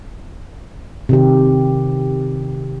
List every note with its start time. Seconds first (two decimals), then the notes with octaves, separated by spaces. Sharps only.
1.09 C3 D#3 G4